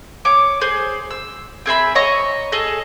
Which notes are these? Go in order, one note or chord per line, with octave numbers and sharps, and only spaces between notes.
C#5 D6
G#4 C5
E6
C4 G#4 E5 B5
C#5 D#5 A#5 C#6
G#4 A4 D#5